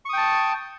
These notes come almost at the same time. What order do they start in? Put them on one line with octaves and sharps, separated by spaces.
C#6 D#6 G5 A5